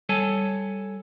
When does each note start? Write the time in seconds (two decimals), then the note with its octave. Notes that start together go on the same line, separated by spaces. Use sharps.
0.09 G3 A4 C#5 G#5 A5